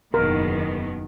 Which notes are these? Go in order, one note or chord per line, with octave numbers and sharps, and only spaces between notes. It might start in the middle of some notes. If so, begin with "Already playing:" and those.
F#1 E2 B2 D#3 B3 A#4